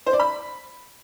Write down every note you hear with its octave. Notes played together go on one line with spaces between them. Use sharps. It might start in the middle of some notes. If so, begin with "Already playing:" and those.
C5
D5
B5